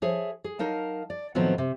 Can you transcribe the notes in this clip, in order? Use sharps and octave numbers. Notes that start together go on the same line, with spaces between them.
F3 G#4 C#5 E5
G#4
F#3 D#4 A#4 F5 A5
D5
A2 D#3 F3 F#3 B3 C4
C3